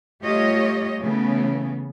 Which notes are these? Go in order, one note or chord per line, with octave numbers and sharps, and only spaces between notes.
G3 A3 F4 G4 C#5 D#5
C#3 E3 A3 B3